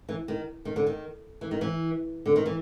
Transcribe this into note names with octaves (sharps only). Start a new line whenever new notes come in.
E3
D#3
D#3
D3
D#3
E3
D#3
E3
D3
D#3
E3